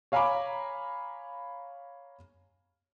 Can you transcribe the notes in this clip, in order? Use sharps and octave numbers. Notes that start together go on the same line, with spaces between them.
C#5 F5 G#5 A#5 B5 D6